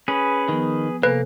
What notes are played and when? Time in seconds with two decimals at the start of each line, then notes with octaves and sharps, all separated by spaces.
0.08 C#4 G#4 B4
0.49 D#3 F3 B3
1.03 C3 A#3 A4 B4 G#5